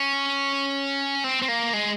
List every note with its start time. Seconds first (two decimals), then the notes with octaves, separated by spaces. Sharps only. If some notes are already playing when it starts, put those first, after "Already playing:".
Already playing: C#4
1.24 C4
1.42 C4
1.48 A#3
1.73 G#3